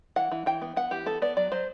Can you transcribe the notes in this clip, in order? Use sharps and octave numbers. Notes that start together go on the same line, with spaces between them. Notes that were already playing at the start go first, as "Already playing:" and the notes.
E3 F#5
E3
E3 G5
B3
B3 F#5
E3 G4
B3 A4
B3 D5
F#3 D5
F#3 C5